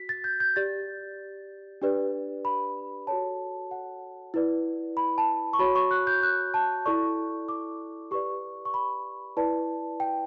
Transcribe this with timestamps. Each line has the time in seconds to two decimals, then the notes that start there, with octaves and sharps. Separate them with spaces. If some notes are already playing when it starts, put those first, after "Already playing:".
Already playing: F#4 B6
0.09 A6
0.24 G6
0.40 G6
0.56 G4 D5 A6
1.82 D4 G4 B4 D5
2.45 B5
3.07 F#4 A4 C#5 A5
3.71 F#5
4.34 E4 B4 D5
4.97 B5
5.18 A5
5.53 C#6
5.59 F#4 C#5 B5
5.76 C#6
5.91 F#6
6.07 G6
6.23 F#6
6.54 A5
6.86 E4 A4 D5 C#6
7.49 D6
8.11 G4 B4 D5 C#6
8.65 C#6
8.74 B5
9.37 E4 B4 D5 A5
10.00 G5